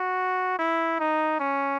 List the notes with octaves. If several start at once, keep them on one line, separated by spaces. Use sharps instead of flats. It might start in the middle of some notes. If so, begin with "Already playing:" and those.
Already playing: F#4
E4
D#4
C#4